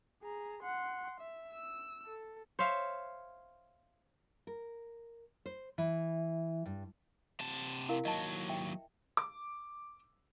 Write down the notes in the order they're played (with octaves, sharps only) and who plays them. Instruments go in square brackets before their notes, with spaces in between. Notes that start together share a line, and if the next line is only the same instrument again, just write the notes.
[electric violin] G#4 A#5
F#5 C6
E5
E6
A4
[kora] C5 C#5 E5 F5
[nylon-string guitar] A#4
C5
E3
G2
[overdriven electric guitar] C3 A5
[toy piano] E4 A#4 F5
[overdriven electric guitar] D#2 F#3 [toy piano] D#5 A5
[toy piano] E5 G5
[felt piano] D6